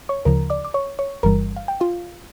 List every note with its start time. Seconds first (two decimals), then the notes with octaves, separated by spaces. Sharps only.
0.09 C#5 C#6
0.25 D2 C#3 F3 A#4 A#5
0.50 D5 D6
0.65 D6
0.74 C#5 C#6
0.99 C#5 C#6
1.23 G1 G2 E3 G3 A#4 A#5
1.56 F5
1.68 G5
1.80 F4 F5